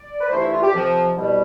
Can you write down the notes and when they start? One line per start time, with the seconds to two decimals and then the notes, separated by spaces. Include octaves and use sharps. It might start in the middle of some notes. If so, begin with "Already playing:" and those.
Already playing: D5
0.20 B4
0.29 G2 E3 A3 C5
0.40 E4
0.51 F4
0.62 G4
0.73 F2 C3 F3
1.16 C2 B2 G3